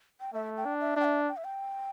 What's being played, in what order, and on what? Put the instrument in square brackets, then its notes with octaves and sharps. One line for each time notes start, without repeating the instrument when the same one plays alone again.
[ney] G5
[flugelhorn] A3 [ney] E5
[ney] G5
[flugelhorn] D4
[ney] E5
[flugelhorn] D4 [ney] G5
[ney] E5
G5
E5
G5